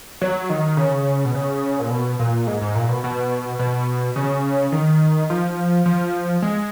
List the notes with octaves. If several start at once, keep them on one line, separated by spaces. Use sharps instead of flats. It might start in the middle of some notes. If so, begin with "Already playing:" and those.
F#3
D#3
C#3
B2
C#3
A#2
B2
A#2
G#2
G#2
A#2
B2
B2
B2
C#3
D#3
F3
F3
G#3